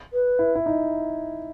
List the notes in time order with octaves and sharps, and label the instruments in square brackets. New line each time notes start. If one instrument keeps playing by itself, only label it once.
[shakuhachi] B4
[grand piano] E4
E4
D#4